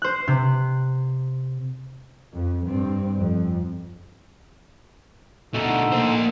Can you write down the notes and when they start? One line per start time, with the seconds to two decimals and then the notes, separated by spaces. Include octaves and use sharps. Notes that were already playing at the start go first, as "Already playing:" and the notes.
0.02 C5 F#6
0.28 C3
2.32 F2
2.68 G2 C4
3.20 F2
5.54 B2 D3 A3 D#4 A4
5.92 A#3 C5